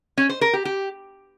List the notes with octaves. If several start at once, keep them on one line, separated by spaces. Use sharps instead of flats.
C#4
C5
A#4
G4
G4